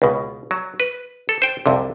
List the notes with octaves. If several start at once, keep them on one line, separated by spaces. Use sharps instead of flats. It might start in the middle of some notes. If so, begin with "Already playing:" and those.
C#2 B2
F#3
B4
A4
C5 G5
C2 F2 C3